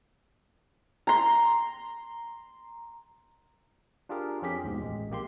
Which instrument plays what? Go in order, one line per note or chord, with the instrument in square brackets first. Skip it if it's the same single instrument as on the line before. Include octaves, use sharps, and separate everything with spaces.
[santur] A#5 C6
[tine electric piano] D4 F4 G4 G#4 A#4
F2 C#4 G4 G#4 B6
D#2 G#2 B2
A1 G#3
A#1 A#3 G4 C6